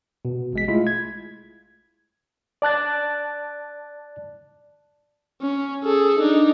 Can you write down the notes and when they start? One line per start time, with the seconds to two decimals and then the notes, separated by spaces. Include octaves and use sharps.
0.25 B2
0.53 A1 G#3 B6
0.68 G#3 A3 E4 F4
0.87 G#6
2.62 D5 A5 F#6 A6
5.41 C#4
5.84 G#4 A4
6.19 D4 D#4